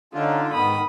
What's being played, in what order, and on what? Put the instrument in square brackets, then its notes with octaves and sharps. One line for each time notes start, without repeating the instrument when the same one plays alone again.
[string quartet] D3 [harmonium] C#4 D#4 [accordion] F4
[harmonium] G#2 B3 [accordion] D#3 [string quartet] B5 D#6